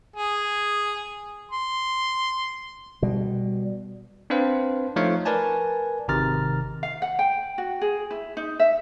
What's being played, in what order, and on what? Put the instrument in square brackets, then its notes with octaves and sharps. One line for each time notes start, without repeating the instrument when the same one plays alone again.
[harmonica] G#4
C6
[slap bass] B2 G3
[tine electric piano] C4 D4 B4 C5 F5 A5
F3 A3 D#4 C#5 F5 C#6
A#4 B4 D5 G#5 A5
G#1 C3 D#3 A#5 F6 A6
[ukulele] F5
F#5
G5
F#4
G#4
E4
D#4
E5